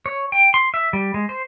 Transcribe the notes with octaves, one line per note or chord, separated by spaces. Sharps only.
C#5
G5
C6
E5
G3
G#3
C5